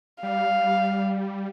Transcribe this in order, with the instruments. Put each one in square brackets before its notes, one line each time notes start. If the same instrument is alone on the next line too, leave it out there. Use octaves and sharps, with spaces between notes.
[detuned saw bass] G3 [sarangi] F5